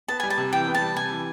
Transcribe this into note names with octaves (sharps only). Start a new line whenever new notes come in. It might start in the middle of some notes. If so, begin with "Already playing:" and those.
B3 A5
G3 G#5
A5
C3
E3 G5
B3
A5
G3
C3 G#5
E3